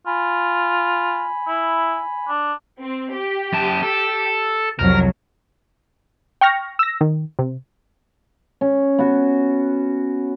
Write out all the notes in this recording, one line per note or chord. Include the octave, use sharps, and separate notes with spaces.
F4 G#5 B5
E4
D4
C4
G4
F#2 A5
A4
C2 F2 F#3 A#4
G5 C#6 F6 A#6
E6 A#6
D#3
C3
C#4
B3 F#4